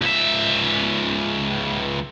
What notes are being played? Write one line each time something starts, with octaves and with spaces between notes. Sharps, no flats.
C#2 E5